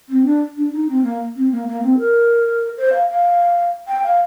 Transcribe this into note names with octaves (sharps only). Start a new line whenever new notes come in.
C4
D4
D4
D#4
C4
A#3
C4
A#3
A#3
C4
A#4
C5
F5
F5
G5
F5